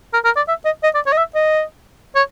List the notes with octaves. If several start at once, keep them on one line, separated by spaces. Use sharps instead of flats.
A#4
A#4
D5
E5
D#5
D#5
D5
C#5
D#5
E5
D#5
C#5